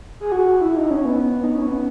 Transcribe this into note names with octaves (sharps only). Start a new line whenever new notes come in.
G#4
F#4
E4
D#4
C#4
B3
D#4
C#4
B3